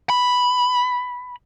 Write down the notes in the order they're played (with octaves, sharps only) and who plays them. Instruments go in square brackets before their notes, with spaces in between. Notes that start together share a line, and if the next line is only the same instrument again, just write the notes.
[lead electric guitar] B5